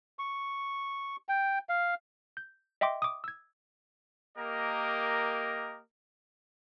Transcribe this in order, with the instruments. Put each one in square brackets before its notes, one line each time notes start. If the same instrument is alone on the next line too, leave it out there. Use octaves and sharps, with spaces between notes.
[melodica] C#6
G5
F5
[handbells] G6
D#5 E5 G5 C6 D6
D6 D#6
E6 G#6
[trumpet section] A#3 G4 A#4 D#5